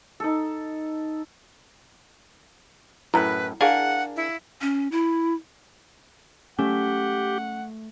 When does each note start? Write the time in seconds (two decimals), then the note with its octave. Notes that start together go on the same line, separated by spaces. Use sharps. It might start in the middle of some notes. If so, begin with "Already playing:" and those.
0.20 D#4 A4
3.14 F#2 A2 E4 B4
3.61 D4 G#4 A#4 F5 F#5 G#5
4.16 E4
4.61 C#4
4.92 E4
6.59 A3 C#4 G4 F#5